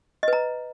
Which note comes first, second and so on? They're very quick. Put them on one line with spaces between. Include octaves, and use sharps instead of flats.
D#5 B4 A#5